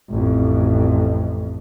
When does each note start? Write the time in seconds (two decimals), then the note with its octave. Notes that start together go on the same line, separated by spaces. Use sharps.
0.10 A1 F2